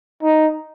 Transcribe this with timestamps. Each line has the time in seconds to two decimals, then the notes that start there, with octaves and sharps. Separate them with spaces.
0.22 D#4